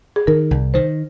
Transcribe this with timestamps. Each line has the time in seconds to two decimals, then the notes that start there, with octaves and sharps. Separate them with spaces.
0.16 G#4
0.27 D#3 A#4
0.51 C2
0.74 D#3 C5